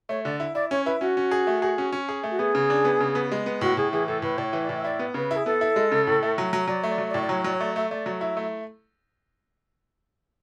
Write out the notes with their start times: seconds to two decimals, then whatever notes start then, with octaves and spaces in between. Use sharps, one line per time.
0.09 A3 C#5
0.25 D3 D5
0.40 E4
0.55 E4 D5
0.71 C#4 C#5
0.85 E4 B4
1.01 C#4 F#4
1.17 C#4
1.31 G#4
1.47 A3
1.62 G#4
1.78 C#4
1.92 C#4
2.09 G#4
2.23 A3
2.31 F#4
2.39 B3 G#4
2.55 C#3
2.70 D4
2.85 B3
3.00 C#3
3.15 B3
3.32 G#3
3.46 B3
3.61 A2 F#4
3.77 A2 G#4
3.92 E3 G#4
4.07 A2 A4
4.22 A2 B4
4.38 A2 D5
4.44 C#5
4.53 E3
4.63 D5
4.69 A2
4.77 E5
4.84 E4 D5
4.99 B3
5.14 C#3 B4
5.31 E4 G#4
5.45 B3 A4
5.61 E4
5.76 G#3
5.92 C#3
6.07 A2
6.23 A3
6.38 F#3
6.53 F#3
6.68 F#3 D5
6.83 A3
6.89 D5
6.98 F#3
7.09 D5
7.14 A2
7.22 D5
7.29 F#3 C#5
7.44 F#3 D5
7.54 C#5
7.60 A3 D5
7.76 A3 E5
7.91 A3 D5
8.06 F#3
8.21 E4 E5
8.37 A3